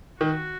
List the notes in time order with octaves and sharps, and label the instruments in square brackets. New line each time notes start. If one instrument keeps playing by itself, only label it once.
[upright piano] D#3 [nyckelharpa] F#4